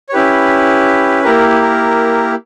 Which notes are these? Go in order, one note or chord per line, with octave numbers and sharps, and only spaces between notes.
C#5
C#4 E4 G4 B4
A#3 E4 G4 A#4
A#4